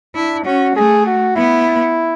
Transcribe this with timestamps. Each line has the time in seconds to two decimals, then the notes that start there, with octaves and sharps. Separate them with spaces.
0.15 D4 E4
0.45 C#4 F#4
0.76 A3 G#4
1.06 F#4
1.36 B3 E4